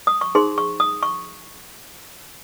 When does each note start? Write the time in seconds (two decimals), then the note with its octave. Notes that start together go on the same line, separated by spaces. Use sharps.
0.07 D#6
0.21 C#6
0.35 D#4 G#4 C5 C6
0.58 C#6
0.80 D#6
1.03 C#6